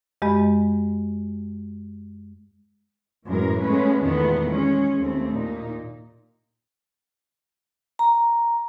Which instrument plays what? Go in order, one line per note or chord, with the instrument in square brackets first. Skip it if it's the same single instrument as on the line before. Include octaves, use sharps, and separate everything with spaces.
[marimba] F#2 G#3 G4 D#5 B5
[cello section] F#2 A2 E3 G#3 A#4
G#3 A3 B3 C#4 B4
E2 A#2 D#3 G#3 A3 B3
G#3 C#4
D#2 A3 C4
A#2 D#4
[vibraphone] A#5